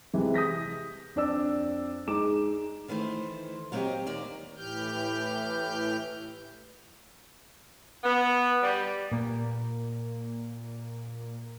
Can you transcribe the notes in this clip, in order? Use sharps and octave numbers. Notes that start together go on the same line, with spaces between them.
C3 E3 G#3
D#6 G6 A#6 B6
F2 D4 D5 E6
G#3 D#4 D6 E7
D#3 E3 A3 C5
F#3 A#3 C4 F4 G4 D#5
D#2 A#3 A#4 D5
A2 E3 G4 F6 G6
B3
G3
A#2 A#3